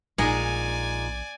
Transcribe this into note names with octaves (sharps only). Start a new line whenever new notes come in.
A#1 A#2 G#3 D#4 D5 G#5